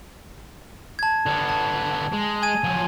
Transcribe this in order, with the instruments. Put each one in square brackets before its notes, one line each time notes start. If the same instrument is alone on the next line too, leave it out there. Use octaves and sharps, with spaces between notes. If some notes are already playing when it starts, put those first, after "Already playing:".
[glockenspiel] A5 G#6
[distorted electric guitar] D3 B3
[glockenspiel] A5
[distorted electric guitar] G#3
[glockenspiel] G#5 G#6 D#7
[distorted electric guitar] F3 F#3